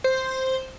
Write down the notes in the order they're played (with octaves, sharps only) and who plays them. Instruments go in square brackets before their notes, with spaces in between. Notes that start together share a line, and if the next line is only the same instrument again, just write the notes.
[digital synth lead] C5